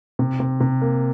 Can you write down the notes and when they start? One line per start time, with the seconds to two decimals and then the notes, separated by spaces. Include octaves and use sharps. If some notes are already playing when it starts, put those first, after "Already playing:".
0.19 C3
0.40 C3
0.60 C3
0.82 A#3